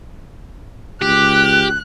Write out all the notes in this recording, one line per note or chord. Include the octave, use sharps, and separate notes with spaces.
C#2 G4 F#6